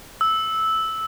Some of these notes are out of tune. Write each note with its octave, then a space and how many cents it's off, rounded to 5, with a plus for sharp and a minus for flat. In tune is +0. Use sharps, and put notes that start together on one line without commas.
E6 -10